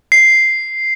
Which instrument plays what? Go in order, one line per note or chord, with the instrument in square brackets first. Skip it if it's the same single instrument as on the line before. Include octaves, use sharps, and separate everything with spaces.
[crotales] C7